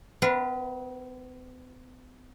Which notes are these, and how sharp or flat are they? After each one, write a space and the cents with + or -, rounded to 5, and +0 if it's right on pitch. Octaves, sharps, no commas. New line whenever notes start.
B3 +45 B4 -25 F5 -30